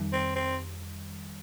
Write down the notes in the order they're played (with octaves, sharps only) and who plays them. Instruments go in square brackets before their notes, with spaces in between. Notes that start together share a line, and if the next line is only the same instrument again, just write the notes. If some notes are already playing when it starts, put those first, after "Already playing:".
Already playing: [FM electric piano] F2 D#3 G3
[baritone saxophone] C4
C4